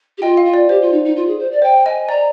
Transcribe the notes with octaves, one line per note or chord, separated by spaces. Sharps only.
G4
F4 D#5 G5
F5
F4
D5
G4 C5
F4
D#4
D#4
F4
G#4
C5
D5
C5 G5
D#5 G#5
D5 A#5